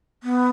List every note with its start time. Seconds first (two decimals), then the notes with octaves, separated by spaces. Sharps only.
0.23 B3